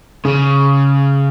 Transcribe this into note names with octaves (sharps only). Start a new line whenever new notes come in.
C#3